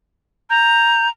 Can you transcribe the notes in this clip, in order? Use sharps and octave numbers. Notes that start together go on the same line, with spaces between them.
A#5 G6